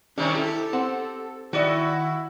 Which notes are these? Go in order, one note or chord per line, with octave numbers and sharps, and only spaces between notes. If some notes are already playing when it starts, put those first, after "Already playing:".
C3 D#3 G3 C#4 D4
E4 G4 A4
C4 C5 F#5
D#3 E4 F#4 D5 D#5